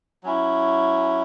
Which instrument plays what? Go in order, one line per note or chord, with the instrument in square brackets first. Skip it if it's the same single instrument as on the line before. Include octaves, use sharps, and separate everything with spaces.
[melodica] F#3 C#4 E4